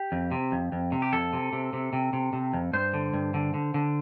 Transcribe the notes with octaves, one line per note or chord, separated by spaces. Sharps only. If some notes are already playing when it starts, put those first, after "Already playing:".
Already playing: G4
F2
C3
F2
F2
C3
G4
F2 A4
C3
C3
C3
C3
C3
C3
F2
G2 C5
D3
G2
D3
D3
D3